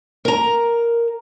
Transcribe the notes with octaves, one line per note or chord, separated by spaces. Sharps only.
A#4 A#5